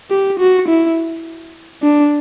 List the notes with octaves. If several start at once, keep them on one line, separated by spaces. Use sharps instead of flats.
G4
F#4
E4
D4